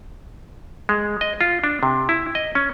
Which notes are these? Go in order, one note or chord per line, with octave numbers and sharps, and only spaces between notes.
G#3
D#5
F4
D4
C3
E4
D#5
C#4